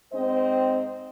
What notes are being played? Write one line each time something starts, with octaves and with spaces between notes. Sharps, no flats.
G#2 C4 C5 D#5